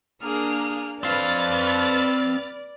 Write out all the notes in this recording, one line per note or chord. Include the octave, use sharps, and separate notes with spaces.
A#3 D4 G#4 F6
C4 B4 D5 F5 F6 A6